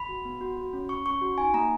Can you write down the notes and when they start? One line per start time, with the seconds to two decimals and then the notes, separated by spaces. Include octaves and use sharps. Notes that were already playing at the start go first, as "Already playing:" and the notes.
Already playing: B5
0.09 F#4
0.25 B3
0.41 F#4
0.57 F#4
0.73 C#4
0.89 C#4 C#6
1.06 C#4 C#6
1.22 F#4
1.38 D#4 G#5
1.54 A#3 A#5